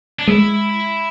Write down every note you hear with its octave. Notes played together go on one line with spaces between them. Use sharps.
D4
G#3 E4